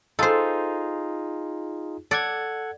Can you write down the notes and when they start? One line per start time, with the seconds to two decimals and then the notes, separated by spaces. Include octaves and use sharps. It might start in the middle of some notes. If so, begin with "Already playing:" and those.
0.19 D#4 F4 G#4 A4 C5
2.11 A4 D5 F#5 G#6